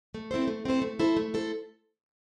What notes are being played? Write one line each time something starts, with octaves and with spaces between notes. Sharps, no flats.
A3
C4 E4 A4 C5
A3
C4 E4 A4 C5
A3
E4 A4 C5
A3
E4 A4 C5